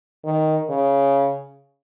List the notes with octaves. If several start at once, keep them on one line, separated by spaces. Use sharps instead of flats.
D#3
C#3